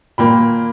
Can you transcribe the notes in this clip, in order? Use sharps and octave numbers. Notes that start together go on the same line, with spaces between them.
A#2 A#3 G5 B5